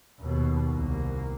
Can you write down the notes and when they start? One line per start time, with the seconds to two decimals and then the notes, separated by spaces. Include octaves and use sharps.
0.20 D#2 B2
0.71 C2 A#3